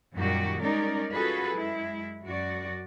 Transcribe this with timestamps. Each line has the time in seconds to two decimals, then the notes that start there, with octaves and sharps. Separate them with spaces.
0.14 F#2 A#2 D#3 G3 F#4 G4
0.60 G3 G#3 C#4 D#4 A#4 D5
1.12 C#4 F4 F#4 G#4 A4 B4
1.51 F#2 G#3 E4
2.26 F#2 F#4 D5